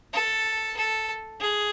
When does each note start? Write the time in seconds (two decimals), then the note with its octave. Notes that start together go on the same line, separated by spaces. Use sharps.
0.14 A4
0.77 A4
1.40 G#4